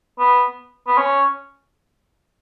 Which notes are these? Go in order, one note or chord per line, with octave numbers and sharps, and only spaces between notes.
B3
B3
C#4